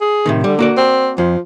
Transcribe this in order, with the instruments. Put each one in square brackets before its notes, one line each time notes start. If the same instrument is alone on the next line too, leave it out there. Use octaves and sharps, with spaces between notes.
[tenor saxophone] G#4
[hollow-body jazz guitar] A2 C3 D#3
[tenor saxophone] D3 [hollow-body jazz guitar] G3
[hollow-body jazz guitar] A#3 F#4 D5
[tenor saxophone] C4
[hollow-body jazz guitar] F2 [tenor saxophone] F3